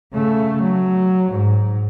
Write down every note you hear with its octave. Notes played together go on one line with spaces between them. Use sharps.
C#3 A3
F#3
G#2